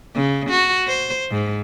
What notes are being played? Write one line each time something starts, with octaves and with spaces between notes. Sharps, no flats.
C#3
F#4
C5
G#2